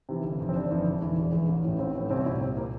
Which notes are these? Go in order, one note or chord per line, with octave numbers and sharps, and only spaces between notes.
C3 E3
G1
F2 E3
C4
G1 D4
F2 E3
E1
E2 E3
E1
E2 E3
A1
A2 E3
A1 C4
A2 E3
C2 C4
A#2 E4
C2 C4
A#2 A#3